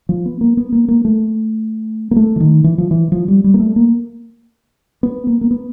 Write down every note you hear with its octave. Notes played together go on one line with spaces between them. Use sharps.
F3
B3
A#3
B3
A#3
A#3
A3
A#3
A3
E3
D#3
E3
F3
E3
F3
G3
G3
A#3
A3
A#3
B3
A#3
A#3
B3